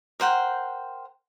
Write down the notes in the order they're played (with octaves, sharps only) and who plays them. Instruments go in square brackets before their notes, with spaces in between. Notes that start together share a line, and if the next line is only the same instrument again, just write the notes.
[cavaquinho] A#4 C5 F#5 G5